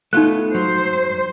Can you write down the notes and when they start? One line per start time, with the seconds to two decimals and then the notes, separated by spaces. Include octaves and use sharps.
0.13 A3 B3 D#4 F4 F#6
0.55 F#3 C5